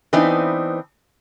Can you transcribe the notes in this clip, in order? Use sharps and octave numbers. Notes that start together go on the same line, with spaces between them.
E3 B3 C4 D4 D#4